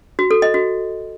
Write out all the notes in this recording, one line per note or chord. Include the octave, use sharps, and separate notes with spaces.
F#4
A4
D#5
F#4